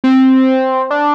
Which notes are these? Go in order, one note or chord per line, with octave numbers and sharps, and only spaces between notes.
C4
D4